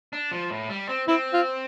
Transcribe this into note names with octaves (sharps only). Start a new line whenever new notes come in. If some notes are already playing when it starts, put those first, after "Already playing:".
D4
F3
A2
G3
C4
C4 E4
F4